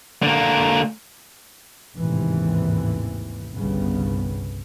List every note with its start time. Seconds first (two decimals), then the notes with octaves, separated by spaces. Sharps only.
0.23 D3 A#3
1.96 A1 D#2 G#2 C3 E3
3.56 G1 C2 C#3 B3